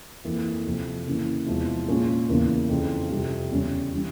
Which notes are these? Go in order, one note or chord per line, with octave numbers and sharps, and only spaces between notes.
F2 E3 A#3
F2 C3 F3
C#3 E3 A#3 C#4 E4
E2 C3 F3 G#3 E4
A#2 G#3 C#4 F4 G#4
E2 C#3 E3 A#3
F2 C#3 E3
F2 C3 G3
E2 C#3 G3 C#4
E3 G3 C#4